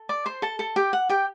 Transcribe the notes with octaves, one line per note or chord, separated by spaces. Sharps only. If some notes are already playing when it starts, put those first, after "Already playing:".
Already playing: A4
D5 D6
C5 C6
A4 A5
A4 A5
G4 G5
F#5
G4 G5